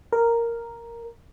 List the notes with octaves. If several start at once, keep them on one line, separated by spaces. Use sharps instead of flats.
A#4